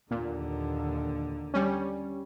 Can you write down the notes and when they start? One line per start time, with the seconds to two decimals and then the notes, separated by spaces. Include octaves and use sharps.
0.11 D#2 A#2 D3
1.54 G3 C#4